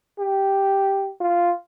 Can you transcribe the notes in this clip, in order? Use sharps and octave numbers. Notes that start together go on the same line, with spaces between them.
G4
F4